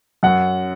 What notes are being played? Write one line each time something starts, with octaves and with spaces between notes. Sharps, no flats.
F#2 F#5